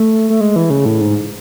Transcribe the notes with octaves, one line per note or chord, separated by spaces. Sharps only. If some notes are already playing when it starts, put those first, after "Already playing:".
Already playing: A3
A3
G#3
E3
C#3
A2
G#2